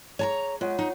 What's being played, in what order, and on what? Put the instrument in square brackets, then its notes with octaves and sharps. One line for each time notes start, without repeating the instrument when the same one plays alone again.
[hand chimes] G#4 [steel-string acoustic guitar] C#5 A5 A#5
[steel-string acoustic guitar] G#3 [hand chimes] F4 C#5 F#5
[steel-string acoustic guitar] D#4